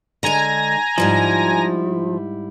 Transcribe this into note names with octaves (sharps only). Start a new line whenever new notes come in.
D3 G#3 G#5 A#5 A#6
G#2 F3 G3 E4